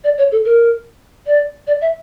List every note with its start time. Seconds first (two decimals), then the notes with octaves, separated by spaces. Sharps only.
0.04 D5
0.18 C#5
0.32 A4
0.45 A#4
1.26 D5
1.67 D5
1.81 E5